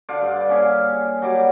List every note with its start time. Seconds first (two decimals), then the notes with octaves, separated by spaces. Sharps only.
0.09 D3 F4 D5
0.21 G2
0.49 A#3 C#4 G#4
1.22 F#3 G3 D5